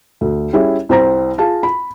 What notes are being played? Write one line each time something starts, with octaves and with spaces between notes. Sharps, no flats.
D2
G3 C#4 E4 G#4 E5
C2 C4 C5 A#5 A#6
F4 G#4 F5 A5
B5